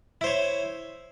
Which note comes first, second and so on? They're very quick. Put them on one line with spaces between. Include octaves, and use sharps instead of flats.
E4 C5 C#5